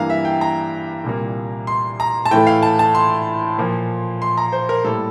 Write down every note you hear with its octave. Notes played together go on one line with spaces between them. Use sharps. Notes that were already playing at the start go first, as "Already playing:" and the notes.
Already playing: G2 E3 G3 A#3 F5 A#5
E5
G5
A#5
C2 A#2 G3 A#3
C6
A#5
A5
A2 E3 A3 G5
F5
A5
A5
C6
A#2 F3 A#3
C6
A#5
C5
A#4
A2 G3 A#3 A4